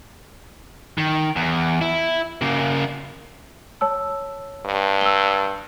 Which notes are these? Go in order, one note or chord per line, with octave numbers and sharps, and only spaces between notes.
D#3
E2
E4
C#3 A#3
C#5 A5 E6
G2
E6 G7